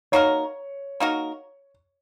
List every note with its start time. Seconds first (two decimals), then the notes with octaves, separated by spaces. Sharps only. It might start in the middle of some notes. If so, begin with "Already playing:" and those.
0.12 A#3 D#4 F#4 A#4 C#5
1.00 A#3 D#4 F#4 A#4